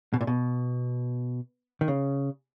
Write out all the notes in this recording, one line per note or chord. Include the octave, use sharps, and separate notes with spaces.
B2
A#2
B2
D#3
C#3